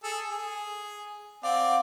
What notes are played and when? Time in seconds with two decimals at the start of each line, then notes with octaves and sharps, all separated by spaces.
0.04 G#4 A4
0.29 G#4
1.43 C4 D5 F5 F#5